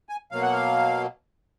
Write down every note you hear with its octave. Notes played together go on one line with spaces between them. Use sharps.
G#5
B2 F#3 A#3 F5
F#5
F5